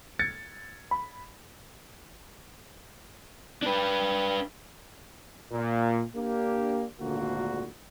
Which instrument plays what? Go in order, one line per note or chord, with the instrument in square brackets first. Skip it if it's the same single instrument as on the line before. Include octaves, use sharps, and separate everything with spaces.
[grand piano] G#6 A6 C#7
B5
[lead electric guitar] D4 B4
[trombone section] A#2
A#3 D4 G4
G#1 D2 A#2 D3 A#3 F#4